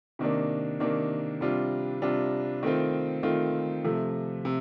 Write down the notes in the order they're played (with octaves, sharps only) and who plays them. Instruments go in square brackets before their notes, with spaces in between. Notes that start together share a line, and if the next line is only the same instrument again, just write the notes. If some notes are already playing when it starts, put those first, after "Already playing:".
[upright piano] C3 D#3 A#3 D4
C3 D#3 A#3 D4
C3 G3 D4 F4
C3 G3 D4 F4
D#3 A3 C4 F4
D#3 A3 C4 F4
C3 F3 A3
C3